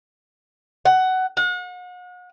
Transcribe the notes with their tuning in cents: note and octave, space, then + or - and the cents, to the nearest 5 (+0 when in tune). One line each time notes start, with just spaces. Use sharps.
F#5 +15
F#5 -40